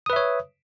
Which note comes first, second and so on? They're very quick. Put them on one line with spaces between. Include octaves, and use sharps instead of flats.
D#6 B4 E5 C#5